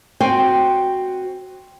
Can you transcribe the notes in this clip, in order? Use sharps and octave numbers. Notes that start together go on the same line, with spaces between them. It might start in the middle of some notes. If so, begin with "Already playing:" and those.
C4 F#4 C5 G5 G#5